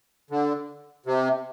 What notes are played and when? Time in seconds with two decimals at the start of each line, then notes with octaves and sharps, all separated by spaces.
0.30 D3
1.06 C3